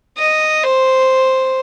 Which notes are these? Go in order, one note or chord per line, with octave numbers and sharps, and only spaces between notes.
D#5
C5